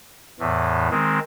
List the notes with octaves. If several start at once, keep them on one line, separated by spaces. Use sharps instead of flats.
E2 A2 E3
D#3 G#3 C4